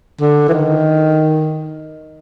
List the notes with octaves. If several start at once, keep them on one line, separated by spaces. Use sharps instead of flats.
D3
E3
D#3